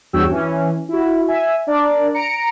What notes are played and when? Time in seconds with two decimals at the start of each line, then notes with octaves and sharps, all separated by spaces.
0.13 E2 G2 F#4 C#5 G5 E6
0.30 E3 C#4
0.89 E4 F#4
1.28 E5 G#5
1.67 D4 A#4 D5
2.14 A#5 C#7 D7